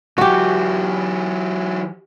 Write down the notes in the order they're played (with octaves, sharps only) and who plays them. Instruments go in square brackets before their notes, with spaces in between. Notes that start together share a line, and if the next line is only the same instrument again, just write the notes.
[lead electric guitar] E3 F#3 [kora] F#4 G4